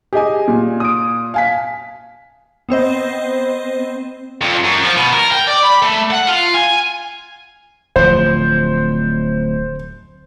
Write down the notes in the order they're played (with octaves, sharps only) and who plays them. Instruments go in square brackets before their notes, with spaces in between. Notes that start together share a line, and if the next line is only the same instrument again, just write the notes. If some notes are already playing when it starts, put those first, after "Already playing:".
[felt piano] G4 D#5 [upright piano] G#4 G#5
[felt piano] A#2
[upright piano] D#6 D7
[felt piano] F5 G#5 B6
[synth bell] B3 C4 C5 D#5
[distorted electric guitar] F2
F#2
F3
B2
A#4
G5
D5
B5
A3
F#5
F4
G#5
[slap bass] D1 F3 [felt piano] C5